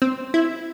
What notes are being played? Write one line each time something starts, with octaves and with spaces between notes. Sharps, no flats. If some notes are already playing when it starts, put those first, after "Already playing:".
C4
E4